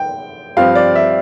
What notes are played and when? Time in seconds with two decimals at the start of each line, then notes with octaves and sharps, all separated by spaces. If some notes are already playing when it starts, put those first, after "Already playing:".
Already playing: G5
0.57 G2 F3 C4 F5
0.75 D5
0.96 E5